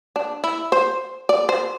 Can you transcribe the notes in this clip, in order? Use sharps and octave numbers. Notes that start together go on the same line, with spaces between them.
D4
E4
C5
D5
C5